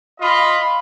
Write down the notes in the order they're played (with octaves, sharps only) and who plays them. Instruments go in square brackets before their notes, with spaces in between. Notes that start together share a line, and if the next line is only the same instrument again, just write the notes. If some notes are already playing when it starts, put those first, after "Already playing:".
[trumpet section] F4 D#5 B5